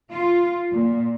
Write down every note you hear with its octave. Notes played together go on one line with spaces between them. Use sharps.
F4
A#2